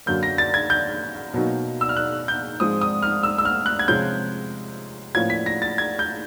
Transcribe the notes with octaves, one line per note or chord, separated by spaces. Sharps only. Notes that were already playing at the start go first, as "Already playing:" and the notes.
F#2 D3 F#3 A#3 G6
A#6
A6
G#6
G6
B2 F#3 A#3 D#4
E6
F6
F#6
G6
G#2 F3 G#3 C4 D#6
D#6
F6
E6
E6
F6
F#6
G#6
C3 F3 G#3 C#4 G6
A2 F3 A#3 C#4 F4 G#6
B6
A#6
A6
G#6
G6